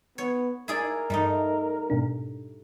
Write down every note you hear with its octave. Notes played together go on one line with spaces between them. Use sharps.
B3 C#5
E4 G#4 A#4 D5
G2 G3 A3 D#4
G#2 B2 D4